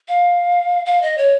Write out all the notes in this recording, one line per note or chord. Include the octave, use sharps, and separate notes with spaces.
F5
F5
D#5
C#5